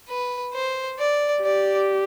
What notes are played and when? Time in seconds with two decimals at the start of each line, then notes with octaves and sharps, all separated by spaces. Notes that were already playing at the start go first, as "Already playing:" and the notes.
0.08 B4
0.53 C5
0.99 D5
1.44 G4 D5